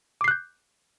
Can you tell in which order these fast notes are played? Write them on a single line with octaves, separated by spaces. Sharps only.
D6 C7 F#6 G6